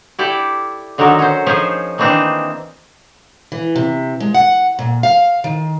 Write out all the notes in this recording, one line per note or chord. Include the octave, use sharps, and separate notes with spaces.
E4 G4 A4 D5
D3 D#3 F#3 A4 A#4
C#4 C5
F3 C#4 D#4 G#4 C5 G#5
D#3 E3 A#3 C4 D4 D#4
E3
C3
G#3
F#5
A#2
F5
D#3